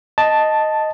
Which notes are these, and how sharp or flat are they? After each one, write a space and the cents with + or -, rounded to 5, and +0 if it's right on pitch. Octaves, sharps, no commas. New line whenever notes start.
D#5 +0 A5 +0